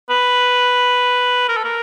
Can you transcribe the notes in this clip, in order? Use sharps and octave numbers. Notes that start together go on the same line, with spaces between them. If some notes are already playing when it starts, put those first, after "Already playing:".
B4
A#4
A4
A#4